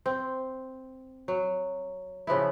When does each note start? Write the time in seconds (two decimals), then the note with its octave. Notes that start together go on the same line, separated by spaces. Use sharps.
0.06 C4
1.28 F#3
2.27 C#3 F3 B3 E4